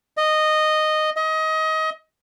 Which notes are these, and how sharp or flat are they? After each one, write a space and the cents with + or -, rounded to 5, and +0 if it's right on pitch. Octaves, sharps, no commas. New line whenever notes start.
D#5 -10
D#5 +25